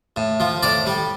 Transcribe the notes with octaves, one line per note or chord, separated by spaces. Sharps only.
A2
F3
A2 D5
G3